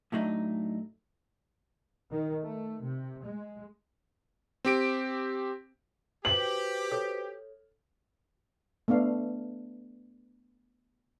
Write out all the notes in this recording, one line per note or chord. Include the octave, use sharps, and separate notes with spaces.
A2 F#3 A3 D4 D#4
D#3
A3
C3
G#3
C4 G4 D7
F#4 G4 B4 C5 F#7
A4 C#5
A3 B3 D4 F5